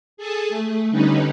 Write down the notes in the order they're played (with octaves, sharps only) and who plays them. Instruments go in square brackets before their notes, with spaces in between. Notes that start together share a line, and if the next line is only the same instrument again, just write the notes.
[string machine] G#4 A4 G#5 A5
A3
D3 G3 C#4 D#4 B4